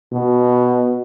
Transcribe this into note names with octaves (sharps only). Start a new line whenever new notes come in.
B2